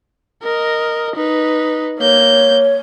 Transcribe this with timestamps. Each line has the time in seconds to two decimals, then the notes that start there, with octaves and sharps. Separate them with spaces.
0.43 A#4 D#5
1.16 D#4 B4
1.99 A#3 C#5 G6